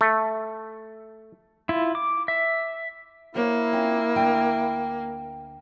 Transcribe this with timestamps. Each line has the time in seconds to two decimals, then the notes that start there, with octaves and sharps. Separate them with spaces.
0.01 A3
1.69 E4 F4
1.95 D6
2.28 E5
3.35 A#3 E4 F#4 C5 C#5
3.73 C4 C#4 F4
4.15 D2 G5